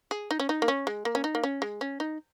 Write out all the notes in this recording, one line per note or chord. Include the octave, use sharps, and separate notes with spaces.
G#4
D#4
C#4
D#4
A#3
C#4
G#3
A#3
C#4
D#4
A#3
C#4
G#3
C#4
D#4